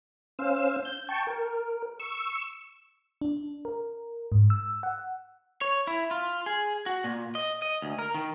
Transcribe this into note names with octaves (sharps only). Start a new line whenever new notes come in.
C#4 C5 F5 E6
G6
G5 A5 C#6
A#4
C#6 E6
D4
A#4
G#2
E6
F#5
C#5
E4
F4
G#4
F#4
A#2
D#5
D#5
D2
A#4
D#3